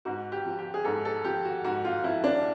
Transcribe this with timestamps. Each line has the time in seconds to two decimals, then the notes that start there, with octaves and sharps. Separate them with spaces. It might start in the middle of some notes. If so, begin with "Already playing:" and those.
0.05 G#2 F#4
0.32 G4
0.45 F3
0.59 G4
0.74 G#4
0.84 G#2 A4
1.05 A4
1.24 F3 G4
1.45 F#4
1.64 G#2 F#4
1.84 F4
2.04 F3 E4
2.24 D4